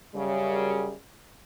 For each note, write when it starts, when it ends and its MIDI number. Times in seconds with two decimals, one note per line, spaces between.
0.14 0.93 42
0.14 0.93 49
0.14 0.93 55